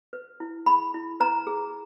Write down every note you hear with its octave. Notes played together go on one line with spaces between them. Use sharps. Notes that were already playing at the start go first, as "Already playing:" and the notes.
B4
E4
G#4 B5
E4
B4 A#5
G#4